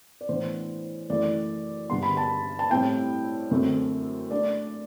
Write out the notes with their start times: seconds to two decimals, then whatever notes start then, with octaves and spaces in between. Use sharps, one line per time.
0.21 D5
0.29 A2 E3 B3 D4 C5
1.10 F#2 E3 A3 E4 D5
1.89 G2 D3 G3 B3 C6
2.03 B5
2.17 A5
2.59 A5
2.70 A2 G3 C4 E4 G5
3.51 F#2 D3 A3 C4
4.31 A3 D4 D5